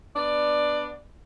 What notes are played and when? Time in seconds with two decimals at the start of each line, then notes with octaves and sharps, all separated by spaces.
0.15 B3 D4 D5